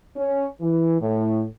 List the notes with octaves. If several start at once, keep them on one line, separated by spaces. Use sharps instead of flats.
C#4
E3
A2